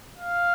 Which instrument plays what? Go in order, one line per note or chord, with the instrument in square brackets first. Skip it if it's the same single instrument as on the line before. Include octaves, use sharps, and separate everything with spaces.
[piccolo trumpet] F5